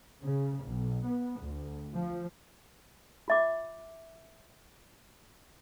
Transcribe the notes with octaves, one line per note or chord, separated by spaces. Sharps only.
C#3
B1
B3
D2
F3
F4 E5 D6